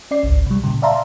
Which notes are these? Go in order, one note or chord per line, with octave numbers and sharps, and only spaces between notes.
C#4 D5 C7
G#1 C#2
C3 G3
A#2 C#3
D5 E5 F5 A5 A#5 C6